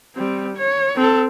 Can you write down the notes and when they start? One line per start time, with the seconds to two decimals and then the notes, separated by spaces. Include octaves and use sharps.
0.16 G3 C4
0.57 C#5
0.96 C4 A4